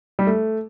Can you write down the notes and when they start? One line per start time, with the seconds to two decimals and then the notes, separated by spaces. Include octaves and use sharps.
0.19 G3
0.27 A3